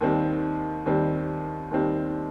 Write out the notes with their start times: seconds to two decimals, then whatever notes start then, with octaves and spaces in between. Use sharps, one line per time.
0.01 D#2 D#3 G3 C4
0.86 D#2 D#3 G3 C4
1.71 D#2 D#3 G3 C4